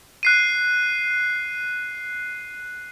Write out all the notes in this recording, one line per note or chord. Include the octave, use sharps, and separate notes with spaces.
F#6 C7 D#7